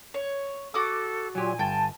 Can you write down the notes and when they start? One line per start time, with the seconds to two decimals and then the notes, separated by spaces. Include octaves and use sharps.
0.14 C#5
0.74 F#4 A4 D6 D#6
1.35 A#2 F#3 G4 G#5
1.59 G1 G5 A5